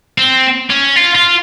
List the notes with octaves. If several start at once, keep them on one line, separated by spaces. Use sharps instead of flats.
C4
C#4
F4
F4